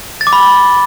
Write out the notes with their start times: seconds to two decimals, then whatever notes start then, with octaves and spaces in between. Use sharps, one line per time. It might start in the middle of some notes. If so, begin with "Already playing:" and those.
0.21 A6
0.27 D6
0.33 B5